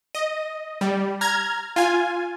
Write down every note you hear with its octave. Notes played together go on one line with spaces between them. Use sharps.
D#5
G3
A#5 F6 G#6
F4 G#5